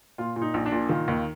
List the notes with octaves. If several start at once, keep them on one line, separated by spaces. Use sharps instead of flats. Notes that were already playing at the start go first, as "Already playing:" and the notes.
A#2 F4
A#2
D#4
A#1
D4
A#2
D#3 F4
D#2